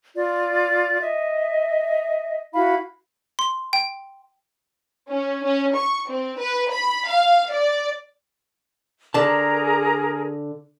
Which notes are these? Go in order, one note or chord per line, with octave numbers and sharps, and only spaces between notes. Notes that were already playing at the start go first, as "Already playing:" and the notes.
F4 D5
D#5 E5
E4 F#4 F5 B5
C6
G5
C#4
C#4
C#6
C4
B4
B5
F5
D5
D3 G#4 A#4 A5 A#5